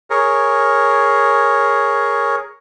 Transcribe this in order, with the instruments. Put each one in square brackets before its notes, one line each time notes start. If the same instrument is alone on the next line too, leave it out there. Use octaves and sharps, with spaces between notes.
[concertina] G#4 A#4 C#5